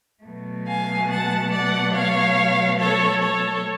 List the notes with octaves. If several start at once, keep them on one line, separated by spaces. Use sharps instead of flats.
B2 F#3 A3
F5 G#5
F#5 A5
D5 F#5
C#5 F5
A4 C#5
A4 C#5